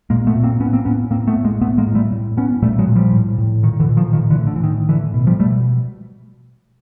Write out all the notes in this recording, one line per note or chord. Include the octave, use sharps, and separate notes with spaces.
A#2 G#3 A#3
A3 B3
A#2
A#3 C4
A2 B3 C#4
A#3 C4
A2 B3 C#4
A2 A#3 C4
A3 B3
A2
G#3 A#3
A2 A3 B3
G#3 A#3
A2
G3 A3
A2
A2 B3 C#4
A#2 G3 A3
F#3 G#3
A#2
F3 G3
A2
A2
A#2 D#3
D3 E3
A#2
D#3 F3
A2 D#3 F3
D3 E3
A2
D3
E3
A2 D#3
A2 D3 E3
B2
F3 G3
B2 G3 A3